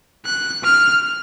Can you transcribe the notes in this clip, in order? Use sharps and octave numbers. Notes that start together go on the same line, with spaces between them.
F#6
F6